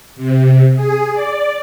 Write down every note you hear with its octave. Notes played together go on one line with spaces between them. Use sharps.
C3
G#4
D5